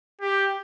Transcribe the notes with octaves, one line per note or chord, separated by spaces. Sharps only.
G4